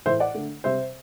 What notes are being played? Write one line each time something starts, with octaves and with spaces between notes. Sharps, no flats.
A2 E3 A3 C5 E5
D5 F#5
D3 A3
C3 G3 C5 E5